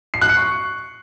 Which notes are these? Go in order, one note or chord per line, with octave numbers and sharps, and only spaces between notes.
C7
F#6
C#7
C#6